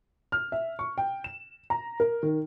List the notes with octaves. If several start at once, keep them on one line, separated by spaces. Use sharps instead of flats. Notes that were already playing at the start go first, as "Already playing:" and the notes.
F6
E5
C#6
G5
E7
A#5
A#4
D#3